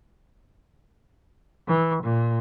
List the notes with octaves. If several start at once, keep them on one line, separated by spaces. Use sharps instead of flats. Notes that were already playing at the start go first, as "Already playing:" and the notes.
E3
A#2